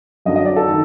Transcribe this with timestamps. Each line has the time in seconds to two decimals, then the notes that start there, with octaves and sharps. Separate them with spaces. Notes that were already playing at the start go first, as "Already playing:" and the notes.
0.25 F#2 D3 F#3 D#5
0.36 D#5
0.45 D5
0.56 A4
0.68 D#3